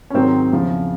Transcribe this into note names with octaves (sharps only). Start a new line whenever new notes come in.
C#4
G#2 D#3 F#3 C4
E2 C#3 F3